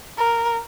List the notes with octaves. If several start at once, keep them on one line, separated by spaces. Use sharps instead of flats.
A#4